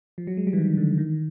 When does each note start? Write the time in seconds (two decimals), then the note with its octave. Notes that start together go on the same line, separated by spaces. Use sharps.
0.18 F3
0.27 F#3
0.37 G#3
0.47 G3
0.53 E3
0.58 D#3
0.77 D3
0.98 D#3